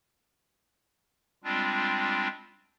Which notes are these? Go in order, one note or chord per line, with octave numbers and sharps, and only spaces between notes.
G3 G#3 C4 D4 F4